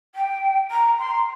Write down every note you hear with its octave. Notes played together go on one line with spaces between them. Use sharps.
G5
A#5
C6